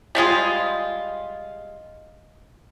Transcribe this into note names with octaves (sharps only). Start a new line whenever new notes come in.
G3 G#3 F4 G#4